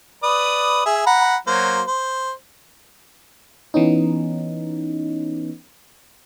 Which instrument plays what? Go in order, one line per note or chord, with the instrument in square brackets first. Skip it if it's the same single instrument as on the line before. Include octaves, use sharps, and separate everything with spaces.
[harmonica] B4 D5 D#6
G#4 E5
F#5 A#5 B5
F#3 A#3 C5
C5
[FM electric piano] E3 B3 C#4 D#4